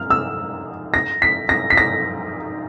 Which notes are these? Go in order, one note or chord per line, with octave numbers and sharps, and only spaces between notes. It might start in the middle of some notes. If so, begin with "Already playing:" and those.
Already playing: F6
E6
A#6
B6
A#6
B6
A#6